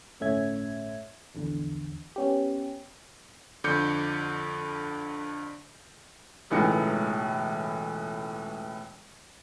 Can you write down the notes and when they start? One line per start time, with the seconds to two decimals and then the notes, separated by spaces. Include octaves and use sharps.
0.20 G1 A2 A3 C#4 E5 G#6
1.35 A#1 E2 D3
2.16 B3 C#4 G4
3.64 F2 D3 D6 G6 C#7
6.50 E1 C#2 A2 E3 D#4 C#7